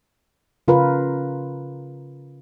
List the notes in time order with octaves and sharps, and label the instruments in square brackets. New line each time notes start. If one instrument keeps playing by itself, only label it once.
[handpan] C#3 F4 A#4 B4